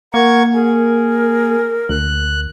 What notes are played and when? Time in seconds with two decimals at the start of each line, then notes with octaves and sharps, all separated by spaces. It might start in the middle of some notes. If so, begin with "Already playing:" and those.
0.14 A#3 A#4 F#5 C#6 G#6
0.54 G#4 A#4
1.89 D2 F#6